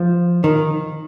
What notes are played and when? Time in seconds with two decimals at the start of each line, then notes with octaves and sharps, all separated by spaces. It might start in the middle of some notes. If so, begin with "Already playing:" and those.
Already playing: F3
0.44 D#3